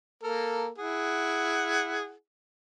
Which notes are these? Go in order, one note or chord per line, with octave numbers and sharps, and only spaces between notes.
A#3 A4 A#4
E4 G#4 F#5